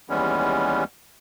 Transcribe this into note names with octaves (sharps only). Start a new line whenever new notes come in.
D#2 E3 G3 G#3 B3 C#4